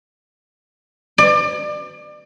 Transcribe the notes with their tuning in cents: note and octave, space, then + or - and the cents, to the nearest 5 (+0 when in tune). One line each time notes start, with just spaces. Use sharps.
D5 +30